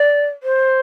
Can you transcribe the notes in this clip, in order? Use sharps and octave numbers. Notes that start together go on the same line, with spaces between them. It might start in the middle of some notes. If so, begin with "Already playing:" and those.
Already playing: D5
C5